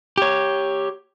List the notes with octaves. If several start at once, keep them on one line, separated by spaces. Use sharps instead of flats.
G4 C#5